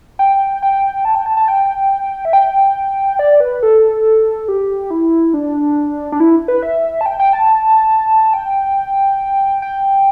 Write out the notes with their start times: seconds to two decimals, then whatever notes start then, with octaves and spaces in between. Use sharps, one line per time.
0.19 G5
0.62 G5
1.05 A5
1.15 G5
1.26 A5
1.37 A5
1.48 G5
2.25 E5
2.33 G5
3.19 D5
3.40 B4
3.63 A4
4.48 G4
4.90 E4
5.34 D4
6.12 D4
6.20 E4
6.48 B4
6.63 E5
7.01 A5
7.06 G5
7.20 G5
7.33 A5
8.34 G5
9.62 G5